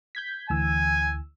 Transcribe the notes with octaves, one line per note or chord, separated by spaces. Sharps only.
G6 G#6 B6
D2 E3 G#5 E6